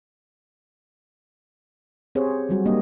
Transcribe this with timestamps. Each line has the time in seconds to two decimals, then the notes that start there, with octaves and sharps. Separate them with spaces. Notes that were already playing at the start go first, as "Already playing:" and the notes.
2.15 C4 G4 G#4 C5 C#5
2.49 F#3 G3 F#4 G4
2.66 G3 A#3 D4 G4 D#5